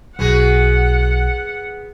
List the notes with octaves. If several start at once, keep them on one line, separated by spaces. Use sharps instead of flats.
B1 B3 F#4 G#4 F#5